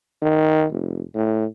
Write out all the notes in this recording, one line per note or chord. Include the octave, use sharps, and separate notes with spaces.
D#3
F1
A2